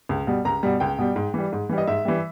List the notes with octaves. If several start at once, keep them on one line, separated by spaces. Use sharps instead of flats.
C#2
B2 G3
C#2 A#5
B2 G3
C#2 G5
B2 G3
G#2
E3 G3
G#2
E3 G3
D#5
G#2 E5
E3 G3